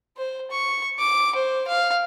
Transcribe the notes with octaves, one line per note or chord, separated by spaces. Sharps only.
C5
C#6
D6
C5
F5